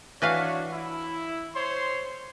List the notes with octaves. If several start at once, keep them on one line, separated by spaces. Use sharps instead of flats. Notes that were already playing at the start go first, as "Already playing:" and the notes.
E3 D4 F#4 B4 C#5 F5
E4
C5 C#5 C6